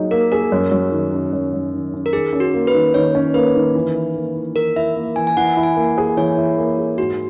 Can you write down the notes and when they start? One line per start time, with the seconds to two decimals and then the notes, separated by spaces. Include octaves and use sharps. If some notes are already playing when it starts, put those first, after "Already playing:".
Already playing: F#3 A#3 D#4 G#4
0.11 A#3 A#4
0.32 G#4 A#4
0.52 F#2
0.71 F#3
0.92 D#3
1.13 C#4
1.33 F#2
1.53 F#3
1.73 D#3
1.94 C#4
2.06 A#4
2.13 D#3 G#4
2.33 C#4
2.40 F#4
2.54 A#3
2.67 B4
2.74 D#3
2.94 D#3 C#5
3.15 C#4
3.34 A#3 B4
3.55 D#3
3.74 E3
3.94 E4
4.15 A#3
4.36 E3
4.55 E3 A#4
4.76 E4 E5
4.96 A#3
5.16 E3 G#5
5.27 G#5
5.37 E3 F#5
5.57 E4
5.63 G#5
5.76 A#3
5.98 G#4
6.17 E3 C#5
6.37 E4
6.58 A#3
6.77 G#4
6.98 G#2 F#4